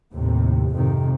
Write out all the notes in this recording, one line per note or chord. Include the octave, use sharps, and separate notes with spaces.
D#2 A2 C3
F2 G#2 C3 D#3